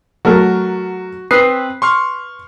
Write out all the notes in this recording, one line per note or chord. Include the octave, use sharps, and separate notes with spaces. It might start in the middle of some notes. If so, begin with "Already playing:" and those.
F#3 A3 F#4 A#4
C4 B4 D#6 C7
C6 C#6 F6